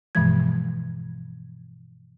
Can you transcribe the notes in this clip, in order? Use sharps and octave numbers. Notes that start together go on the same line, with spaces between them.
G2 B2 E3 F3 G#3 G#6